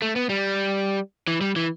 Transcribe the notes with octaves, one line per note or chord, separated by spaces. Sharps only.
A3
B3
G3
E3
G3
E3